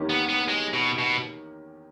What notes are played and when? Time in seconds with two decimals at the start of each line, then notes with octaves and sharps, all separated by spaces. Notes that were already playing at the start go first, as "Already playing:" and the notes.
Already playing: E2 D#3 A#3 C#4 G4
0.10 B3
0.29 B3
0.48 G#3
0.73 B2
0.98 B2